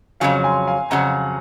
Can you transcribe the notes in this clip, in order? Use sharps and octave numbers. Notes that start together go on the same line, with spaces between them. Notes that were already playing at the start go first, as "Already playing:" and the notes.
F2 C#3 F#3 F5 G#5
G#5 C6
F5 G#5
F2 C#3 F#3 F#5 A#5